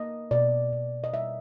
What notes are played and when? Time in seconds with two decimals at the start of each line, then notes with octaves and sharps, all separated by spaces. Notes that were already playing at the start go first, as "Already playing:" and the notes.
Already playing: A#3 D#5
0.31 B2 D5
0.73 B2
1.04 D#5
1.13 G3 E5